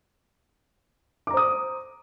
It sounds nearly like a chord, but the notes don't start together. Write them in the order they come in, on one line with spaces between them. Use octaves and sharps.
D6 A#5 C5 D#6